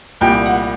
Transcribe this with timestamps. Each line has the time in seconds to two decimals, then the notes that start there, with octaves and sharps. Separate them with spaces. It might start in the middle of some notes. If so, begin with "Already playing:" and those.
0.21 C2 A#2 G3 G5
0.46 F#5